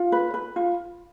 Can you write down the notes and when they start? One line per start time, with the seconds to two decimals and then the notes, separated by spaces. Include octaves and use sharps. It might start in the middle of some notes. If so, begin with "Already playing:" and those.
Already playing: F4
0.12 B4
0.34 B4
0.56 F4